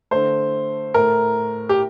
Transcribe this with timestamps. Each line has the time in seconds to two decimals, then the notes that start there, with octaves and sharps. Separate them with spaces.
0.11 D3 A3 C5
0.94 A2 A3 A#4
1.69 G4